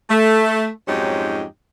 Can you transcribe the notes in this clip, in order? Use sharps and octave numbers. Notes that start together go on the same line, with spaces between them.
A3
F2 G#2 F#3 C#4 D#4 G4